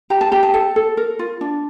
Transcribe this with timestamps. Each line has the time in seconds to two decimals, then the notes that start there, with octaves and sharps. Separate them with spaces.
0.10 G4 A#5
0.21 A5
0.32 G4 A#5
0.43 A5
0.54 A4 A5
0.76 A4
0.97 A#4
1.19 F4
1.41 D4